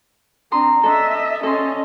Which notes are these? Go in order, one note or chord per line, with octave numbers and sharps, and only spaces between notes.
C4 D4 A#5 C6 D#6
D4 A4 D#5 E5
C#4 A4 D#5 C6